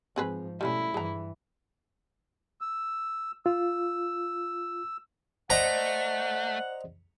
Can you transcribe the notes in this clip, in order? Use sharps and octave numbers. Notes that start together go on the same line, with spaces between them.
G#2 F3 C4 G#4 B4
B2 G3 A3 B3 C#4 E4
G2 E3 G#4 A#5
E6
F4 E6
A3 C5 D5 D#5 F#5 A#5